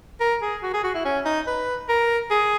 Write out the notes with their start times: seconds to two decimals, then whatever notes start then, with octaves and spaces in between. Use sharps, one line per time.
0.21 A#4
0.42 G#4
0.63 F#4
0.74 G#4
0.84 F#4
0.94 E4
1.05 C#4
1.26 D#4
1.47 B4
1.89 A#4
2.31 G#4